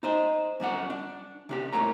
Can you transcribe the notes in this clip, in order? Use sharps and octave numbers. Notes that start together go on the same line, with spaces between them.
D#4 C5 D#5
F#2 G3 D4 F#5
D4
C3 D4 G4
C2 A2 E3 A#3 C#5 A#5